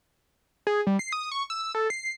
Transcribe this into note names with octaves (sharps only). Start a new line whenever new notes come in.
G#4
G3
C7
D#6
C#6
E6
A4
C7